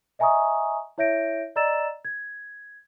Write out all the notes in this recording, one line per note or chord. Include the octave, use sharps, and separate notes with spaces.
D#5 E5 G#5 A#5 C#6 D#6
E4 C#5 E5 G6 A#6 D7
D5 D#5 A#5 E6 A6 E7
G#6